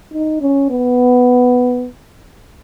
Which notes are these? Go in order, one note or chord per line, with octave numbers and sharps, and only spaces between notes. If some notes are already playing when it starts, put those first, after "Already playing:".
D#4
C#4
B3